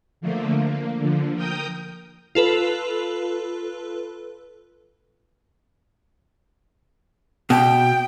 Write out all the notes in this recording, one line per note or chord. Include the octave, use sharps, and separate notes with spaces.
D3 F3 A3 A#3
A#3
D3 F3
A#4 G5 D#6 G6
F4 A4 B4
B2 G5